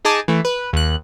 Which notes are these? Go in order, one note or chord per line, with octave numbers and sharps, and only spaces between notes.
D#4 G#4 G#5 A5 D6
E3 A3
B4
D#2 F#6